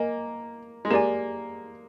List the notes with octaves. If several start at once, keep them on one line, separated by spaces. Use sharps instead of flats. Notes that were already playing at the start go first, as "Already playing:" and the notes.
Already playing: A#3 A#4 D#5 G#5
G#3
A#3 G4 D5 G#5